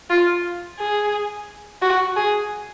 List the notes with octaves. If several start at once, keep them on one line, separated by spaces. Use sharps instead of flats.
F4
G#4
F#4
G#4